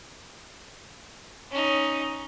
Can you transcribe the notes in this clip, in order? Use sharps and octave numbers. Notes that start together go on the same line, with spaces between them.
C#4 D#4